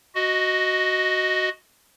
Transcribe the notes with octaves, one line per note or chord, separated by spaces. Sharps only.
F#4 D#5